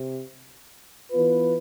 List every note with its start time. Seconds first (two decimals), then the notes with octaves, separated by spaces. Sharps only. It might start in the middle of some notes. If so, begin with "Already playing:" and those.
Already playing: C3
1.11 E3 B3 F4 B4